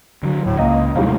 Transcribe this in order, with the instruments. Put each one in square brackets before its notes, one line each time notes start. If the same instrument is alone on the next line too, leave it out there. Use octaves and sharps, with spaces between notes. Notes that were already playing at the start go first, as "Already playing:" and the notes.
[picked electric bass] D3 F#3
[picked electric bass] D1 [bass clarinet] A2
[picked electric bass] C#2 [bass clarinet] A#3 [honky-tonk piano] D#5
[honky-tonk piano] G#1 A2 F5 [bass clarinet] D#2 [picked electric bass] C3 F#3 A3